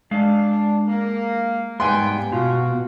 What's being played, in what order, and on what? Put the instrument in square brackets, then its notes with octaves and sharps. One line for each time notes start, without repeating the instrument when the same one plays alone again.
[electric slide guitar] G#3 F5 [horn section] D4
[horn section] A#3
[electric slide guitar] G#2 B3 [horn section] G3 A#3 G5 [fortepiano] G#5 C6
[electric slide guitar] B2 [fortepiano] F4 [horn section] F#4